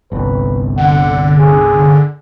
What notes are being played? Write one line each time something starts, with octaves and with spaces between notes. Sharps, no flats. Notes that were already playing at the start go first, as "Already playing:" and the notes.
G1 C2 B4
D3 F#5
G#4